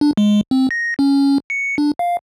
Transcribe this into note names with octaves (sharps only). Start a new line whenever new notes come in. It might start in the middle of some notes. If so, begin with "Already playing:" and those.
D4
G#3
C4
A#6
C#4
C#7
D4
F5